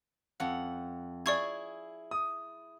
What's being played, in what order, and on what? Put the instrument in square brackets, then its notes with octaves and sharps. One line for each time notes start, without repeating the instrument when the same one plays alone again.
[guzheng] F2 F#5
[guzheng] E4 G#4 [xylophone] D5 C#6 G#6
[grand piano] D#6